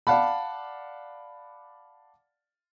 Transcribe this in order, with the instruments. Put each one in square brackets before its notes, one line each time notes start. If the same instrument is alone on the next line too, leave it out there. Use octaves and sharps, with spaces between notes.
[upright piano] D5 F5 F#5 A5 B5